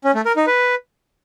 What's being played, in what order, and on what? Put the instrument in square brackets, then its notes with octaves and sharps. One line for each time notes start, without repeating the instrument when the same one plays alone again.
[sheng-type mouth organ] C#4
A3
A#4
D#4
B4